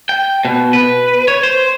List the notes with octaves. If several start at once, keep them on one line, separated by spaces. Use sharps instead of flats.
G5
B2
B4
C#5
C5